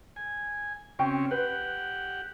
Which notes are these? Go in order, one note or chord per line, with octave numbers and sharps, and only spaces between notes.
G#5
C#3 C4 C#4 F#4 G5
G4 B4 F#5